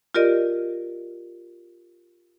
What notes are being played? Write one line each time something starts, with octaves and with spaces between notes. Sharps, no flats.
F4 G4 A#4 D5 D#5